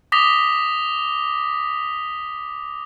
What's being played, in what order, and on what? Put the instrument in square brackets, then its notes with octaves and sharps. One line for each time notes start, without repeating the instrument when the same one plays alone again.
[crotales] D6 D#6 A#6 B6 F7 G7